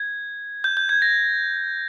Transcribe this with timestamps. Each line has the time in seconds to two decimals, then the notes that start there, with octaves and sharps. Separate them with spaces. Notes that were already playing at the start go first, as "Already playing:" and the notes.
Already playing: G#6
0.64 G6
0.77 G6
0.89 G#6
1.02 A#6